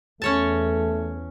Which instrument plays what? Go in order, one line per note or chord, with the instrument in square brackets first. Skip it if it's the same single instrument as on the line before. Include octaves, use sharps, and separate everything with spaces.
[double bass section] E2 [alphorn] A3 [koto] C#4 C#5 A5